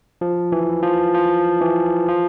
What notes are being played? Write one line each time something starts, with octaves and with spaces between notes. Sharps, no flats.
F3
E3
F3
F3
E3
F3